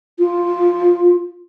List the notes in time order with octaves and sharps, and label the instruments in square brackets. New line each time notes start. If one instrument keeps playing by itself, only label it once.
[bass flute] F4